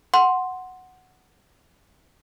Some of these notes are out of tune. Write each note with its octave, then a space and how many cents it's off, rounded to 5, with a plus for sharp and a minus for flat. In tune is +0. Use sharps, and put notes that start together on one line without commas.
F#5 +0 C6 +0